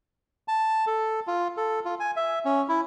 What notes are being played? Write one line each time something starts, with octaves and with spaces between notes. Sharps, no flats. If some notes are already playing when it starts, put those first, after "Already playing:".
A5
A4
F4
A4
F4
G#5
E5
C#4
E4